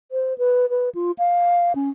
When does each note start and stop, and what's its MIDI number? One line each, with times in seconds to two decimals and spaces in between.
0.12 0.37 72
0.38 0.69 71
0.70 0.89 71
0.95 1.11 65
1.19 1.73 77
1.75 1.89 61